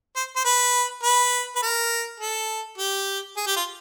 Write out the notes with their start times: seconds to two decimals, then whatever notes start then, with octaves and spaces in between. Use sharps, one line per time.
0.16 C5
0.36 C5
0.45 B4
1.03 B4
1.56 B4
1.63 A#4
2.20 A4
2.78 G4
3.37 G#4
3.47 G4
3.56 F4